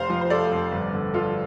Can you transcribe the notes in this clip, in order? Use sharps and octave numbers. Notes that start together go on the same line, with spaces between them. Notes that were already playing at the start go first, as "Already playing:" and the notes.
Already playing: F1 C5 F5
F3
C5
A3 A4 D5
F2
G1
D3
F3 F4 A4